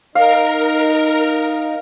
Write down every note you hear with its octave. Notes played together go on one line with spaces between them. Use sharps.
D#4 A#4 F5